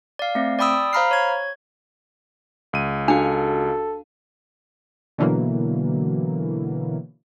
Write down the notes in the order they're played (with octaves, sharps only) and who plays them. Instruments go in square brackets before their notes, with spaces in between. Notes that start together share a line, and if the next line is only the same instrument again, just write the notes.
[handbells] D5 F5
A3 C4
D5 G5 B5 D#6 E6
C5 F5 A#5 B5 F6 C7
C#5 G#6
[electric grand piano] C#2 D#7
[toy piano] D4 [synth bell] F#4 F5 [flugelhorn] A4
[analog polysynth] B2 D3 E3 F#3 A#3